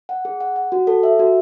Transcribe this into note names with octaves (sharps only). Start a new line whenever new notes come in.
F#5
G#4
F#5
F#5
F#4
A4
E5
F#4